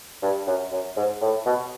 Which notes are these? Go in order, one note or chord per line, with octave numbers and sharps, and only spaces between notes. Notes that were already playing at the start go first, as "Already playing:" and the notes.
G2
F#2
F#2
G#2
A2
B2